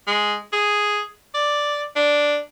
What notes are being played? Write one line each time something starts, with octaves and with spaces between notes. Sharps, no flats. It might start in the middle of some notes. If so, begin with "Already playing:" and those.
G#3
G#4
D5
D4